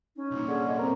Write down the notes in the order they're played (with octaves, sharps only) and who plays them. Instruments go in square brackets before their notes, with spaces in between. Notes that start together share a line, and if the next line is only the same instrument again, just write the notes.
[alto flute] C#4 [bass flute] D#4
[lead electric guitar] C2 A#2
[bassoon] D3 [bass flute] G#4
[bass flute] D#5
[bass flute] C4 [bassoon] A#4